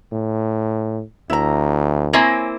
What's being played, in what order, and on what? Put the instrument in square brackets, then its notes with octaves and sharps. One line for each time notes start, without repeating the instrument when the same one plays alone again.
[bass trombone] A2
[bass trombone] D2 [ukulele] E4 A#5
[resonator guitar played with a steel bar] A#3 C4 E4 [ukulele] C#5 G#5